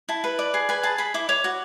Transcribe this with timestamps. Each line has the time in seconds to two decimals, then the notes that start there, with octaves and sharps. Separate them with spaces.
0.09 E4 A5
0.24 B4
0.39 D5
0.54 G#4
0.69 B4 G#5
0.83 G#4 A5
0.98 G#4 B5
1.14 E4 D6
1.29 C#5 D6
1.44 F#4